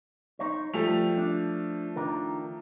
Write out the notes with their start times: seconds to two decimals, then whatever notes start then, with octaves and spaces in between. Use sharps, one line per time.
0.39 D#4 C5 C#5
0.74 F3 G3 A3 F7
1.18 D4
1.96 D#3 D4 A#4